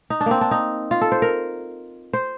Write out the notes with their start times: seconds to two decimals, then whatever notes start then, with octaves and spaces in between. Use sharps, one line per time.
0.10 D#4
0.21 D4
0.26 A#3 C4
0.41 D4
0.51 D#4
0.91 F4
1.01 A4
1.12 C5
1.22 A#4
2.13 C5